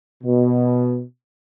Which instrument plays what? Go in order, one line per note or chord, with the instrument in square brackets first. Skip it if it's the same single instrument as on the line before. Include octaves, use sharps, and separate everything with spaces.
[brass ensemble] B2